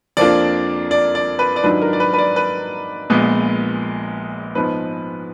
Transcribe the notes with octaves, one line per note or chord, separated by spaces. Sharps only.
F2 F3 A#3 D4 F4 D5
D5
D5
B4
D5
G#2 D#3 F#3 D4 F4 B4
A#4
D5
B4
B4
D5
B4
A#1 A#2 G#3 B3
G#2 F3 B3 B4